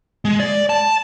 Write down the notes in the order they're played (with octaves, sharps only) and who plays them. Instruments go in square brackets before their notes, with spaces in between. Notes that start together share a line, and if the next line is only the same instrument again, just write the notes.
[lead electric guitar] G#3
D5
A5